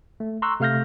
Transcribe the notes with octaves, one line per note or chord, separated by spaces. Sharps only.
A3
A#5 C6 C#6 E6 F#6
C3 A3 F5 F6 G6 A#6